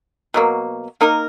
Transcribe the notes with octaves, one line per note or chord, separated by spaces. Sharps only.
B2 F#3 A#3
A#3 D#4 A#4